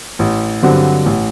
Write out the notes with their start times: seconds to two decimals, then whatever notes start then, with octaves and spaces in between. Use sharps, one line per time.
0.19 A1
0.62 G2 D3 F#3 C4
1.06 A1